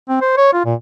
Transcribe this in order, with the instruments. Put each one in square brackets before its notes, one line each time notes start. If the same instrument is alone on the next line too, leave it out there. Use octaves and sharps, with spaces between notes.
[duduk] C4
C5
C#5
F4
A#2